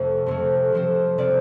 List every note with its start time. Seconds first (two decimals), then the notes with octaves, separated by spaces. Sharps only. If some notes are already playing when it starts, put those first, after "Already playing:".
Already playing: F2 C3 A3
0.26 F2 C3 A3
0.72 C3 F3 C4
1.18 C3 F3 C4 D5